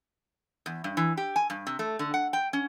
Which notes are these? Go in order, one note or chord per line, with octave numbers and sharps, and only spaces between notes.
E2
G2
E3
G4
G#5
G2
C3
A3
D3
F#5
G5
C#4